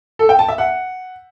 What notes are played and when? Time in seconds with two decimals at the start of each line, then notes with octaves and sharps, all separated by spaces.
0.19 A4
0.29 G5
0.39 A5
0.49 E5
0.58 F#5